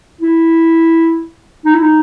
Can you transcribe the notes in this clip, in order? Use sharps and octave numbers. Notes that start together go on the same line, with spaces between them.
E4
D#4
E4
D#4